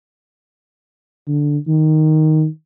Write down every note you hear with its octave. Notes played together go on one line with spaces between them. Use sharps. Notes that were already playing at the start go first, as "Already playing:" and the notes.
D3
D#3